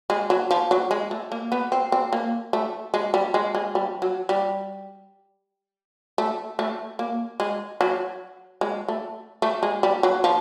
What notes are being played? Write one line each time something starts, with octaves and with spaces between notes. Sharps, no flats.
G#3
F#3
F3
F#3
G#3
A3
A#3
B3
C4
C4
A#3
A3
G#3
G3
G#3
G#3
G3
F#3
G3
A3
A3
A#3
G#3
F#3
G#3
A3
A3
G#3
G3
F#3
F3